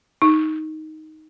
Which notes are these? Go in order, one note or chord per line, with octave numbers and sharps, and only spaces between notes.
D#4